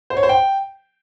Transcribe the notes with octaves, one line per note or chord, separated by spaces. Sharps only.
C5
C#5
C5
G5